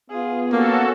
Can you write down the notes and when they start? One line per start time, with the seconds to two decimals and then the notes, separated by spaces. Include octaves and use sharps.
0.10 B3 F4 G#4
0.52 A#3 C#4 F#4 A4